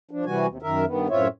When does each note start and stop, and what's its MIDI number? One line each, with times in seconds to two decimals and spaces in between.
0.11 0.25 53
0.11 0.25 62
0.25 0.47 48
0.25 0.47 52
0.25 0.47 55
0.25 0.47 66
0.25 0.47 80
0.47 0.58 39
0.47 0.58 48
0.62 0.85 42
0.62 0.85 51
0.62 0.85 70
0.62 0.85 76
0.86 1.08 43
0.86 1.08 51
0.86 1.08 59
1.10 1.28 42
1.10 1.28 45
1.10 1.28 60
1.10 1.28 65
1.10 1.28 73
1.10 1.28 76